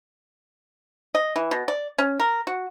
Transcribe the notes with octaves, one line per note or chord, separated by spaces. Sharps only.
D#5
E3
B2
D5
C#4
A#4
F#4